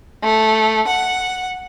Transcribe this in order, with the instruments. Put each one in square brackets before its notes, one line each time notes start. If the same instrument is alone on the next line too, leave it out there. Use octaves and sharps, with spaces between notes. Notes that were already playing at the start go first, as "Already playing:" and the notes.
[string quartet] A3
F#5